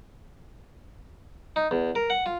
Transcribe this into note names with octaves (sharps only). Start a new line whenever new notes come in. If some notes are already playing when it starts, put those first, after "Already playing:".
D#4
E2
A#4
F#5
F4